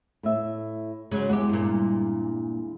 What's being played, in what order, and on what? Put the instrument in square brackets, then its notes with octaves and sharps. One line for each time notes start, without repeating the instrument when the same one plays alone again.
[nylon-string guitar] A2 E5
[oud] C#3 F#3 [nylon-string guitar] G#3
[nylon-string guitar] E2 G#3 [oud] F#4 G4
[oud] G2 A#2